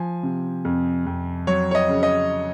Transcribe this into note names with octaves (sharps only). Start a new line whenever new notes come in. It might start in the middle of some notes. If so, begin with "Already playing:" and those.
Already playing: F3 G#5
C3
F2
F2
F#3 C#5
C#5
D#5
C#3
D#5